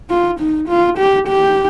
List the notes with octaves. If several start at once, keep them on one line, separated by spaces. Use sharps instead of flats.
F4
D#4
F4
G4
G4